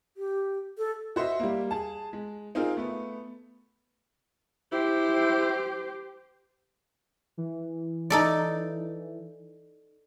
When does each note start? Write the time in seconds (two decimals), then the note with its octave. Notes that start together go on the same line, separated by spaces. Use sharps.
0.17 G4
0.78 A4
1.16 F#4 C5 D#5 E5
1.39 G3 A#3
1.71 G#4 A5
2.13 G#3
2.55 C4 D#4 F4 G#4 A#4
2.77 A3 B3
4.72 E4 G4 C5
7.37 E3
8.10 D#4 A4 D5